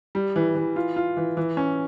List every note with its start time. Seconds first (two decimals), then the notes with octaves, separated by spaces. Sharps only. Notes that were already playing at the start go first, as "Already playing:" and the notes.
0.15 G3
0.36 E3
0.55 E3
0.76 F4
0.96 F4
1.17 E3
1.37 E3
1.57 C#4